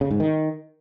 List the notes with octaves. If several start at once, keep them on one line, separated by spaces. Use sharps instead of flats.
C#3
G#2
D#3